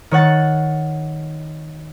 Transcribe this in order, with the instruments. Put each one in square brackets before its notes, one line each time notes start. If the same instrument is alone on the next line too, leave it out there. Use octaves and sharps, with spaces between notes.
[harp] D#3 C#5 F#5 A6